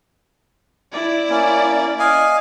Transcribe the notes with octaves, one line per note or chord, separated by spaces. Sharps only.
E4 D5
A#3 C#4
D#5 F5 G#5